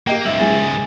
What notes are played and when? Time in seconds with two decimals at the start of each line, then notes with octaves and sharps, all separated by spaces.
0.07 A#3 G4 D#5 G5 G6
0.25 C#2 G#2 G4 E5 F#7
0.40 G#3 A#3 G#4 A6